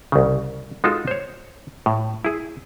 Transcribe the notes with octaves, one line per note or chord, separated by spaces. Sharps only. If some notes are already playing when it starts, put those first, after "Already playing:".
C2 C#3
G#3 D#4 F4 F#4 A4
C5 C#5
A2
E4 G#4